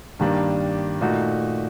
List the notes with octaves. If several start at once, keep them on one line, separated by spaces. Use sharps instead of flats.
G2 D#3 G3 A#3 D4
A#2 A3 D#4 F#4